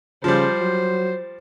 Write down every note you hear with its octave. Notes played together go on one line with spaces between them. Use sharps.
C#3 F3 G3 C5
F#3